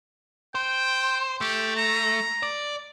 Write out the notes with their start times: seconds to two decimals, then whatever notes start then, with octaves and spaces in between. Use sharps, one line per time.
0.55 C5 G5
1.41 A3 G4
1.77 A#5
2.43 D5